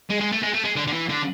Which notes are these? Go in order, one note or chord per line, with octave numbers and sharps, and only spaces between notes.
G#3
G#3
A3
G#3
A3
G#3
D3
D3
E3
D3